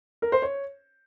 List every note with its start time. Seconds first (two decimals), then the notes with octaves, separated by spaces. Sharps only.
0.22 A#4
0.32 C5
0.42 C#5